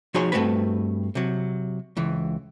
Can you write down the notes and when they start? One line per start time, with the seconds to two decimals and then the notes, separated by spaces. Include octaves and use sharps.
0.14 F3 D#4 F#4 G#4 C#5 C6
0.32 G2 A3 C4 F#4 B4 B5
1.15 C3 F#3
1.97 C#2 E3